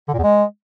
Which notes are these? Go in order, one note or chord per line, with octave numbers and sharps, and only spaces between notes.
D3
A#2
E2
G#3